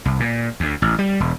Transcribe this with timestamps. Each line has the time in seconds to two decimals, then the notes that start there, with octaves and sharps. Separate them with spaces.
0.05 C2
0.20 A#2
0.60 D2
0.82 A1
0.99 G3
1.20 E1